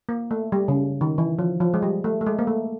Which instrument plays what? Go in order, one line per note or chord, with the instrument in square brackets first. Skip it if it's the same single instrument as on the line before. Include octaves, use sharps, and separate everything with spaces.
[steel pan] A#3
A3
G3
C#3
D#3
E3
F3
F3
G#3
G3
A3
A3
G#3
A#3
A3